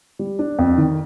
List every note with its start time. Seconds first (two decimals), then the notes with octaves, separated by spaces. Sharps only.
0.19 G3
0.39 D4
0.59 F2
0.78 D#3